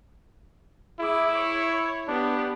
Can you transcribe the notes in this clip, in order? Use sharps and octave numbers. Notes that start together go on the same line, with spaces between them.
E4 G#4 D6
C#5
B3 D4 G4